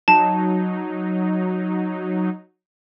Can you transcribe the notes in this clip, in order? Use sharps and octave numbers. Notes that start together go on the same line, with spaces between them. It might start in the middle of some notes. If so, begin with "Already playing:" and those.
F#3 D#4 A5